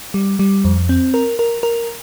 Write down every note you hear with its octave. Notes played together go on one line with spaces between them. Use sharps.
G3
G3
F2
C4
A#4
A#4
A#4